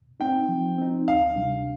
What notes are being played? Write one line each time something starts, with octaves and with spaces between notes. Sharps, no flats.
C4 D#4 G5
F3
C4 D#4
D2 F5
C3 G3 D4